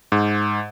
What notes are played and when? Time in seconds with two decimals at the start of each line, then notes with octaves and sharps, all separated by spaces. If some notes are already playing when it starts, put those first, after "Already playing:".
0.12 G#2